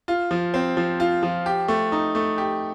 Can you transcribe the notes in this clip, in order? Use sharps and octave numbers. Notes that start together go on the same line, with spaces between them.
F4
F3
C4
F3
F4
F3
G4
A3
D#4
A3
G4